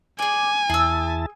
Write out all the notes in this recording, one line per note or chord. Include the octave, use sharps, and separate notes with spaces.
G#4 D5 G#5
E2 E4 G#4 A5 E6